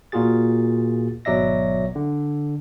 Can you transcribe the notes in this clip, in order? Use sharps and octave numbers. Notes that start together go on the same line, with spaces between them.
A#2 A#3 F4 F#4 G#4 A6
G#1 B2 F#3 D5 E5 A#6
D3